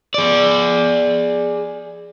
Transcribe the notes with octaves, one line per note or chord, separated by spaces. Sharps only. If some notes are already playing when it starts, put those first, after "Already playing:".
G#4 D5